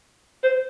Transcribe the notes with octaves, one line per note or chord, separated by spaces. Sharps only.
C5